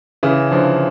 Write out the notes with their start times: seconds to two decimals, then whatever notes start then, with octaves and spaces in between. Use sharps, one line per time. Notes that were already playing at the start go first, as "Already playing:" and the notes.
0.23 C#3 E3
0.52 D3 F3